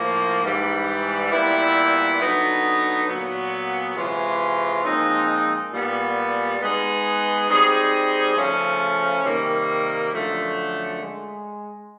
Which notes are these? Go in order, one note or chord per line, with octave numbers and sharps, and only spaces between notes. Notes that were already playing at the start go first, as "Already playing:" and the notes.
Already playing: A2 F3 A#3
G#2 E3 G3
A#2 G3 B3 E4
D3 F#3 B3 D#4
A#2 F#3 B3
C3 E3 G#3 C#4 F4
A#2 F3 G#3 C4 D#4
A#2 G3 B3
G#3 B3 D#4 G#4
G3 C4 D#4 G#4
C#3 F3 A3 C#4
C3 D#3 G3 A#3
F#2 D3 F3 A3
G#3